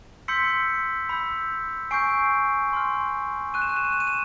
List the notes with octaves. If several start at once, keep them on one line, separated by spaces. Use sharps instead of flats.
C6 E6 G6 B6 C#7
B5 E6 G6
G#5 C#6 E6 G6 C7 D7
C6 F6
C#6 F#6 D#7
E7
D#7
E7
D#7
E7
D#7
E7